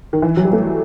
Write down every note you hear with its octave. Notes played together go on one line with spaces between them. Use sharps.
D#3
E3
F#3
G3
A3